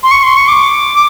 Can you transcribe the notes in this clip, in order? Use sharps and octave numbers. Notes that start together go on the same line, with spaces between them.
C6
C#6
C6
C#6
D6